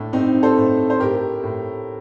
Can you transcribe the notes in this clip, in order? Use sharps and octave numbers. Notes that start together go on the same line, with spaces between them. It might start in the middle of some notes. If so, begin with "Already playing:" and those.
Already playing: A2 D4
A2 C4 D#4
A4 C5
A2
C5
A2 G4 A#4
A2